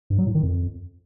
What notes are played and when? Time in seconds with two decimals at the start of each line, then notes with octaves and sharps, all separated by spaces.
0.10 G2
0.18 F#3
0.27 A2
0.35 D#3
0.43 F2